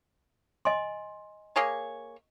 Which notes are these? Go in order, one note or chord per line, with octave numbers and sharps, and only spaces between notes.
D#5 G#5 C6
A#3 G#4 C#5